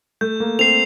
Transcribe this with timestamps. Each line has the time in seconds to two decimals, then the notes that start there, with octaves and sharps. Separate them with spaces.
0.21 A3 G6
0.40 A#3
0.59 C4 C7 F7